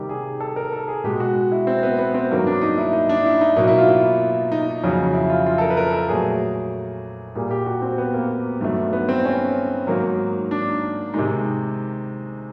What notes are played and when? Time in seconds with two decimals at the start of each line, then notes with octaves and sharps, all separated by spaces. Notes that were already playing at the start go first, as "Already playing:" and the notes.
Already playing: C3 D#3 G3 G4
0.09 G#4
0.40 A4
0.56 A#4
0.73 A4
0.88 G#4
1.04 B2 G#3 G4
1.20 F#4
1.52 E4
1.67 C4
1.83 B3
1.98 B3
2.14 C4
2.31 G2 D#3 F#3 A#3
2.47 D4
2.61 D#4
2.78 E4
2.93 D#4
3.09 D4
3.25 E4
3.41 D#4
3.56 B2 F#3 A#3 D#4
3.67 E4
3.78 F4
3.89 E4
4.52 D#4
4.83 F2 C#3 F#3
5.14 E4
5.30 F4
5.47 F4
5.58 A4
5.61 A#4
5.70 B4
5.77 A#4
5.93 A4
6.09 A#2 F#3 A3 G#4
7.35 A#2 G3 A#3 G#4
7.51 G4
7.66 F#4
7.82 C4
7.98 B3
8.14 A#3
8.61 G2 D#3 F#3 A3
8.93 B3
9.09 C4
9.25 C#4
9.87 G#2 D#3 F#3 A#3
10.51 D4
11.14 C3 D#3 G#3 D#4